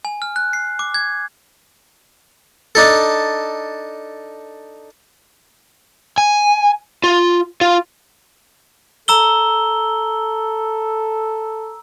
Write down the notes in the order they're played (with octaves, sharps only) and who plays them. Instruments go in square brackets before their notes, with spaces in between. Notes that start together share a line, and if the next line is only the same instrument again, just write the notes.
[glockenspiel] G#5
F6
F#6
C7
D6
G#6
[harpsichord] D4 D#4 A4
[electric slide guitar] G#5
F4
F4
[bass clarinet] A4 [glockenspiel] A#5 E6 G7